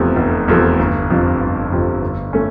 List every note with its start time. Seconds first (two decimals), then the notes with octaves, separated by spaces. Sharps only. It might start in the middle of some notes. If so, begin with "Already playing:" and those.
Already playing: F1 E2 C3 F3 A3
0.16 F1
0.48 E2 C3 F3 A3
0.79 G1
1.10 F2 C3 F3
1.41 G1
1.72 F2 C3 F3
2.02 G1
2.33 A3 C#4